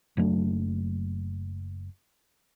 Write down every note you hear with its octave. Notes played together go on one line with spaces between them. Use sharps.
F#1 F#3 A3 D4